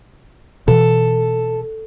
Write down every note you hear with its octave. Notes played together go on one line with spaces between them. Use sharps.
B2 E3 A4